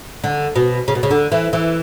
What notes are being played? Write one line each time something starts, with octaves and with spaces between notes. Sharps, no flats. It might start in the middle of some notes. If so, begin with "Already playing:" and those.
D3
B2
C#3
B2
C#3
D3
E3
E3